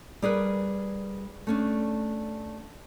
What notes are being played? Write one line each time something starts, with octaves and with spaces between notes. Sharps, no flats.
G3 G#4 A#4 B4
A3 C#4 D4